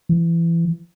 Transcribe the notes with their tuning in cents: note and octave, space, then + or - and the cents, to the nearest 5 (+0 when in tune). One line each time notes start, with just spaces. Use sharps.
E3 +25